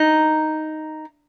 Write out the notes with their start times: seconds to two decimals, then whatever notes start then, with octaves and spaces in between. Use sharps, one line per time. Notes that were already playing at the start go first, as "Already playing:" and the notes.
Already playing: D#4